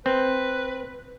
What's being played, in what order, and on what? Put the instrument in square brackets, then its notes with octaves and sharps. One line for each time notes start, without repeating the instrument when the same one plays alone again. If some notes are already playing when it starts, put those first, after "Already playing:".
[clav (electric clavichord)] C4 [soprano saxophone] B4